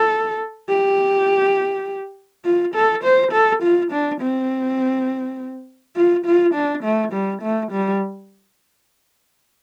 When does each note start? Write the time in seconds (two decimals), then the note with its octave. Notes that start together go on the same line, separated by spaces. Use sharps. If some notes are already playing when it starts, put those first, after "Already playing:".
Already playing: A4
0.69 G4
2.45 F4
2.75 A4
3.04 C5
3.32 A4
3.63 F4
3.92 D4
4.21 C4
5.96 F4
6.25 F4
6.55 D4
6.84 A3
7.13 G3
7.42 A3
7.72 G3